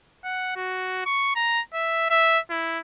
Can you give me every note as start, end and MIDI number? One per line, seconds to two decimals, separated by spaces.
0.24 0.56 78
0.56 1.01 66
1.06 1.35 85
1.36 1.61 82
1.74 2.06 76
2.10 2.39 76
2.50 2.79 64